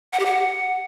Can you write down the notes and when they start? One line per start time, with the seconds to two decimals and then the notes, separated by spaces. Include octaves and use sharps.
0.13 F#5
0.19 G4
0.26 F#5